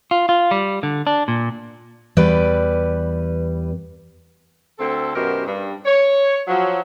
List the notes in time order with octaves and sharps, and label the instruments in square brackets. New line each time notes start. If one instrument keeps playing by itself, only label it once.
[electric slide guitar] F4
F4
G3
D3
D4
A#2
[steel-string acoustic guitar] E2 G3 B4 D5
[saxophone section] D2 C4 A4
F#2 B2 G4 A#4 C5
G2
C#5
F3 F#3